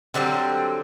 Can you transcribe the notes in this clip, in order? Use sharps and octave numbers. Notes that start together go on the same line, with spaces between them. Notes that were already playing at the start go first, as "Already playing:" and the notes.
D3 F#3 G3 C4